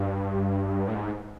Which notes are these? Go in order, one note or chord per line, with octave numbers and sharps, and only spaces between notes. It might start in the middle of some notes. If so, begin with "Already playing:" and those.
Already playing: G2
A2
G#2